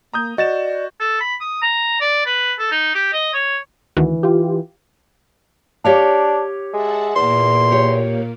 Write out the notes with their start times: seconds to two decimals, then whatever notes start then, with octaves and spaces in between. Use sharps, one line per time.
0.13 A#3 A#5 D#6 G6
0.38 F#4 D5 D#5 A6 E7
1.00 A4
1.20 B5
1.40 D#6
1.62 A#5
2.01 D5
2.26 B4
2.59 A4
2.71 D#4
2.95 G4
3.13 D#5
3.34 C#5
3.97 D2 D#3 E3 F#4
4.23 F4 G4
5.85 D4 G4 C#5 F5
6.73 G#3 E5 F#5 A5
7.16 E2 A#2 A#3 C6
7.71 G4 C#5